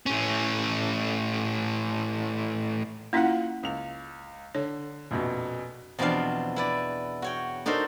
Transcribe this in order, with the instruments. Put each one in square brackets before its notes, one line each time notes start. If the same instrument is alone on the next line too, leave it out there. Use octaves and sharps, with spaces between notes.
[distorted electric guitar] A2 C#4
[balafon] A#3 C#4 E4 [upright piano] F4 F#5
[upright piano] C#2 F7
[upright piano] D3 [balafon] C#5
[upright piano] A#1 F2 B2
[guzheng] E2 B2 F3 C4 D4 F5
E4 B4 D5
F#4 C#5 G5
D4 D#4 F#4 A4 A#4 C5